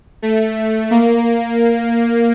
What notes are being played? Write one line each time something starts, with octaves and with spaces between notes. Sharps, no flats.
A3
A#3